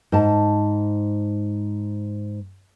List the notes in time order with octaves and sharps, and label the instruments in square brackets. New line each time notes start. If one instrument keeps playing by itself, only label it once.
[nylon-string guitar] G#2 A5